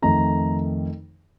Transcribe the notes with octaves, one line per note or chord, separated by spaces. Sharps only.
F2 D#3 A3 D#4 A#5